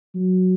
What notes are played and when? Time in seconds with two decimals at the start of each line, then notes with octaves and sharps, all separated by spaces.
0.15 F#3